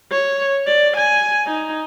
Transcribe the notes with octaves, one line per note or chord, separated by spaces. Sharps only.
C#5
D5
G#5
D#4